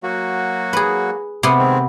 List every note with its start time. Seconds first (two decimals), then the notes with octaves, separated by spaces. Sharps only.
0.03 F#3 A#3 F#4
0.73 G#4 B4
1.43 C3 B3
1.58 D#3 G#3 C4